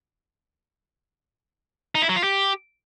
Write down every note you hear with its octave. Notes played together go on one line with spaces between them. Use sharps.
D#4
E4
F#3
F4
G4